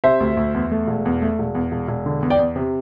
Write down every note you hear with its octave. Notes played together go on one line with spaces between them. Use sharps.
C3 C5 E5
D2
D2
E2
A3
E1
E2
A3
E1
E2
E1
E1
D3
E2
D5 G5
E2
C3